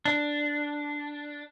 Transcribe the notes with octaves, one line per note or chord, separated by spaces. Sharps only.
D4